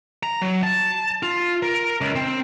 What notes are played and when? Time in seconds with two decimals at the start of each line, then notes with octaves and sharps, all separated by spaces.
0.23 A#5
0.42 F#3
0.63 A5
1.23 F4
1.63 A#4
2.01 C#2
2.16 C4